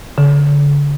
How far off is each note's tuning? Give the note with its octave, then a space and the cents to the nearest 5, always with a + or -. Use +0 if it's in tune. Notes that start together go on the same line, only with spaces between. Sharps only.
D3 -40